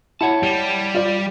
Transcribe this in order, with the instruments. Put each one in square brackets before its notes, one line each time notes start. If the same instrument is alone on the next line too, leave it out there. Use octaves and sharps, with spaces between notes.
[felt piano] E4 [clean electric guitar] C#5 F#5 A5
[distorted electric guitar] G3
[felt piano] F4 D5